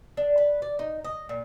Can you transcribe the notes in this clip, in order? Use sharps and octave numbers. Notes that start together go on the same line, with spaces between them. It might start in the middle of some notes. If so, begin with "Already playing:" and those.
D4
B4
D5
D#4
D#5
A#2